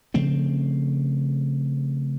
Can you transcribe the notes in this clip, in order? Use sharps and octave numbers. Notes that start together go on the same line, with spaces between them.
C#3 F3 A3 C4